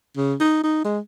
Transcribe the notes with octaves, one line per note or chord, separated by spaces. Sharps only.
C#3
D#4
D#4
G#3